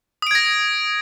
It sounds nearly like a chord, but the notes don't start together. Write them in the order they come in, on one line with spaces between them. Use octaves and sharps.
D#6 D7 G#6 A#6